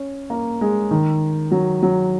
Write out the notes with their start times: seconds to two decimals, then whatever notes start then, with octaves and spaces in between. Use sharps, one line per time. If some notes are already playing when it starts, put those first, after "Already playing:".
Already playing: C#4
0.30 A#3
0.61 G#3
0.91 D#3
1.51 F#3
1.83 F#3